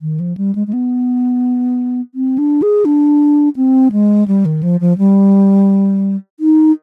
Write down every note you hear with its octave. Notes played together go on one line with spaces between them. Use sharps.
D#3
F3
G3
G#3
G#3
B3
C4
D4
G#4
D4
C4
G#3
G3
D#3
F3
F3
G3
D#4